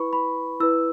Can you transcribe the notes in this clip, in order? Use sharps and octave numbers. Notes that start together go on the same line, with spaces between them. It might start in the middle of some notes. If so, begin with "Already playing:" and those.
Already playing: E4 B4 B5 C#6
B5
E4 B4 E6